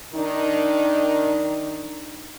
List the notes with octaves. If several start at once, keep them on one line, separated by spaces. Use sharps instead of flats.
D#3 D4 D#4